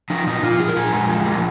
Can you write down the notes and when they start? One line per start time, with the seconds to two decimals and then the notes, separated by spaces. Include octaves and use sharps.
0.10 F3 D#4
0.27 A#2 D#4
0.43 A#2 F4
0.60 F3 G#4
0.68 A#4
0.76 A#2 G#4
0.93 G#3
1.09 F3
1.26 A#3